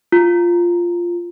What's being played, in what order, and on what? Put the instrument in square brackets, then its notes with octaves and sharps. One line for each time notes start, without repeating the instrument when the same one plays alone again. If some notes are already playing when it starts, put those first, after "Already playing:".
[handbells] F4